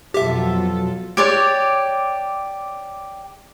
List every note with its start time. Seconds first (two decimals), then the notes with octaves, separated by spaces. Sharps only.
0.14 F2 B2 F#3 F4 G4 A4 E5
1.17 G4 C#5 D5